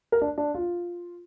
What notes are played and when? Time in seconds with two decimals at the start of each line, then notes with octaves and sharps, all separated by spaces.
0.12 A#4
0.22 D4
0.38 D4
0.54 F4